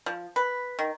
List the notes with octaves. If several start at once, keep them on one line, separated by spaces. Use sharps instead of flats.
F3
B4
D#3